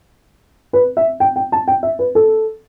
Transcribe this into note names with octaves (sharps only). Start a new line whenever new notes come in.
B4
E5
G5
G5
A5
G5
E5
B4
A4